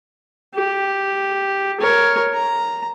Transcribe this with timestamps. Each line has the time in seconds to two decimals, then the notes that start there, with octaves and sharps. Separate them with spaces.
0.55 G4
1.81 A#4 C#5
2.34 A#5